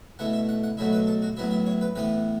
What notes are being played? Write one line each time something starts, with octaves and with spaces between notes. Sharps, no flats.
B2 A3 E4 F#5
E5
F#5
F#5
B2 F#3 A3 E4 E5
B4
A4
F#4
A2 F#3 B3 E4 E5
E5
C#5
B4
A2 E3 B3 B4